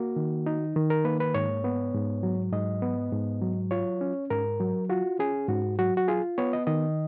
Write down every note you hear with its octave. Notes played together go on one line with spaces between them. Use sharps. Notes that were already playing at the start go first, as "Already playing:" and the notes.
Already playing: A#3 F#4
D#3
D#4
D#3
A#4
A#3 B4
B4
G#2 C#5
B3
G#2
F#3
G#2 D#5
B3
G#2
F#3
F4 C#5
C#4
G#2 A#4
F#3
F4 F#4
C#4 G#4
G#2 F#4
F#3 F#4
F#4
F4 G#4
B3 C#5
D#5
D#3 D#5